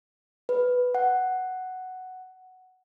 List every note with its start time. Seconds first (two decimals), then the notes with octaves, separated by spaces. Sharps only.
0.49 B4
0.95 F#5